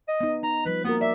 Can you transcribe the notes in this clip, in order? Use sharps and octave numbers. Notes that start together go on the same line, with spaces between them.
D#5
B3 D#4
D#4 A#5
F3 G3 B4
A#3 B3 F#4 A#4
D5 E5